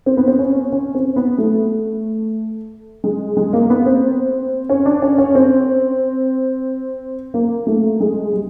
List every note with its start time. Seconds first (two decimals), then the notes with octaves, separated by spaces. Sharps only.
0.06 C4
0.17 B3
0.28 C4
0.39 C#4
0.72 C#4
0.95 C4
1.16 B3
1.38 A3
3.04 G#3
3.37 G#3
3.53 A#3
3.70 B3
3.86 C4
4.69 C#4
4.86 D4
5.02 C#4
5.18 C#4
5.35 C4
7.34 A#3
7.67 A3
8.00 G#3
8.33 G3